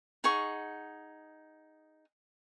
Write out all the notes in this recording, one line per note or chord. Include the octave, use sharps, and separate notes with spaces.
D#4 G#4 F#5 C#6